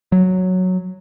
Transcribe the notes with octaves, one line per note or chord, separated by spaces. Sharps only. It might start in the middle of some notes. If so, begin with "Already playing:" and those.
F#3